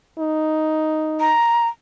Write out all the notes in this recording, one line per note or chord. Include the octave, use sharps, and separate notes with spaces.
D#4
A#5